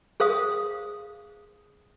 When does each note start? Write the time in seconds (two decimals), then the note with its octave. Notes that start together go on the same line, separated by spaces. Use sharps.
0.20 G#4 C5 F5 D#6